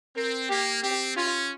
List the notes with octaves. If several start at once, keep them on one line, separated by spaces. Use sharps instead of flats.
C4 A#4
A#3 G4
C4 G4
C#4 F4